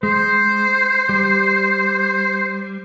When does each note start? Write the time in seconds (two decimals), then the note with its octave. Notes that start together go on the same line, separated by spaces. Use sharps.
0.03 G#3 C5
1.09 G3